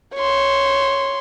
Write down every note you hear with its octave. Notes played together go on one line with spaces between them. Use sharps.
C#5 C6